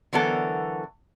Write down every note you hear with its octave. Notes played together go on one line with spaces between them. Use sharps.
D3 E3 F#3 B3 A4 A#4